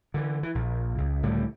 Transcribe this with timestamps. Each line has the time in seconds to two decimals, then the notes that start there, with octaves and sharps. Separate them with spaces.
0.14 D3 E3
0.43 E3
0.55 A#1
0.98 C#2
1.23 C#2 A2 D3 G3